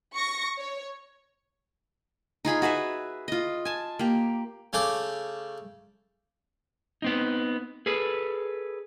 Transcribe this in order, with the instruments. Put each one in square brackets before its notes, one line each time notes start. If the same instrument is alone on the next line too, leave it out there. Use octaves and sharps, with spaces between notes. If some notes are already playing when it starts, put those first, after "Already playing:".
[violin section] C#6 A#6
C#5
[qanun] D#4 F4 G#4 B5
F#4 G#4 B4 E5
F4 D#5
G#5 A5
A#3 G4
[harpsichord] C#3 A3 C#4 G5 D6
[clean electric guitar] B3 C4 D#4
G#4 A4 B4